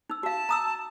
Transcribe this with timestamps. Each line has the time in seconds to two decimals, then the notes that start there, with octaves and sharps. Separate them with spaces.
0.10 D#4 E6
0.23 F#4 F5 A5
0.49 A#5 D#6 E6